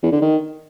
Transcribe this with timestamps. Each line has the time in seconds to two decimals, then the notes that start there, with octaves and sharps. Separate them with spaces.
0.03 E2
0.12 D3
0.22 D#3